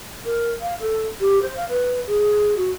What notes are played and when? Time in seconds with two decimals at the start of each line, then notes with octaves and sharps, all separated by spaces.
0.25 A#4
0.61 F5
0.80 A4
1.20 G4
1.42 C5
1.56 F5
1.69 B4
2.07 G#4
2.57 F#4